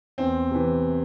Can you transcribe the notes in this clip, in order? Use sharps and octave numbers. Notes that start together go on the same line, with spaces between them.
E2 C4
C3 E3